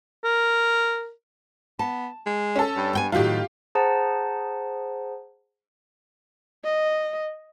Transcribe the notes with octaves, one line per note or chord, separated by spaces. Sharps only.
A#4
B3 A5
G#3
C#4 A4
G2
B3 G5 G#5
A2 D#3 F#3 G#3 F4 G4
G#4 C5 F#5 A5 A#5
D#5